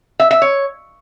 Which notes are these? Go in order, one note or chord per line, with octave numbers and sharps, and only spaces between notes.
E5
E5
C#5